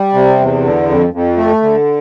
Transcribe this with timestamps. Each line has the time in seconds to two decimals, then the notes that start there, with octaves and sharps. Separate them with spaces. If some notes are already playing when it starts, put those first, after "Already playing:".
Already playing: G3
0.14 C3
0.39 E2
0.64 D3
0.89 F2
1.13 F2
1.37 A3
1.63 D3